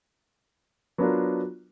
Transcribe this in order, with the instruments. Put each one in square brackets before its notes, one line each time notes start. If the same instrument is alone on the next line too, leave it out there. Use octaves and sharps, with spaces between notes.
[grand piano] F#3 B3 D4 F4 A#4